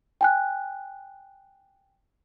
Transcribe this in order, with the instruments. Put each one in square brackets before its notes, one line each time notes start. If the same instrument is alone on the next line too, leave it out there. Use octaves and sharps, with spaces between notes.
[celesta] G5 G#5 F#6